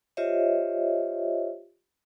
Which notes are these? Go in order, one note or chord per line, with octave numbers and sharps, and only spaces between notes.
F4 G4 C5 C#5 D#5 E5